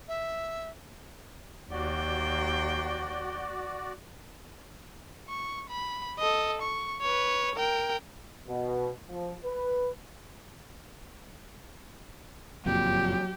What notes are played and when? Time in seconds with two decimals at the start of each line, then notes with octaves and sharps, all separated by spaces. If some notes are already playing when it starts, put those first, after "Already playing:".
0.08 E5
1.71 D#2 F#4 D5 G5
5.29 C#6
5.70 B5
6.19 A4 D#5
6.61 C#6
7.01 B4 C#5
7.55 A#4 G5
8.48 B2
9.09 F3
9.45 B4
12.66 F#1 F2 A#2 F#3 G4